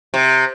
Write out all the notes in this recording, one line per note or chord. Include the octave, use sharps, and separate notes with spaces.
C3